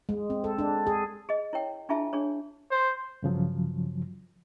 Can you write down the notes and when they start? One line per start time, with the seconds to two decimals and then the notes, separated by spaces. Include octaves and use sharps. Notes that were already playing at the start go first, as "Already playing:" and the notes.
0.09 G#3
0.30 C4
0.44 A4
0.59 D4
0.87 G#4
1.29 G#4 D#5
1.53 E4 C#5 G5
1.89 D4 E4 F4 G#4 E5 A5
2.13 D4 G#4 C#5
2.71 C5
3.23 G2 C#3 F3 F#3